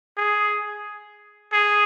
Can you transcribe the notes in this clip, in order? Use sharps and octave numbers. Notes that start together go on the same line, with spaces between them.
G#4
G#4